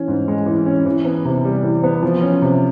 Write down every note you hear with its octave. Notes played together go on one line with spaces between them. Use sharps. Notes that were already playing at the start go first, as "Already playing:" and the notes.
Already playing: E3 C#4
G#2
G#3
E3
C#4
E3
B3
C3
G3
E3
B3
F3
C#4
C3